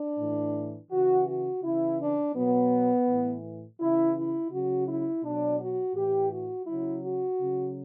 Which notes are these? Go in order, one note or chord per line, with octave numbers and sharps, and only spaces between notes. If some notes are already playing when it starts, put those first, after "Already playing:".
Already playing: D4
A2 E3
C#3 E3 F#4
F#4
C#3 E3 E4
D4
B2 F#3 B3
A2 E3
C#3 E3 E4
E4
C#3 F#3 F#4
E4
B2 F#3 D4
F#4
A2 E3 G4
F#4
C#3 F#3 E4
F#4
C#3 F#3